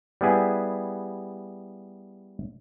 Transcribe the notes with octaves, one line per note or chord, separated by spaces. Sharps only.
G3 B3 E4 G#4 B4